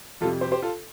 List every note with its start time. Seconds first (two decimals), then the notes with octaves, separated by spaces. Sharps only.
0.21 F2 C3 G3 F4 A4
0.41 G4 C5
0.52 G4 C5
0.62 F4 A4